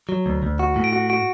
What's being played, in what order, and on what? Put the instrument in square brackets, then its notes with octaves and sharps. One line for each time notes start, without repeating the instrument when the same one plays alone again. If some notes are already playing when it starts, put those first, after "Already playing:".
[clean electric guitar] F#3
D2
D2
F#4
A2
[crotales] D7
[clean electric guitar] F#4
[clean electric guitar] F#4 [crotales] D7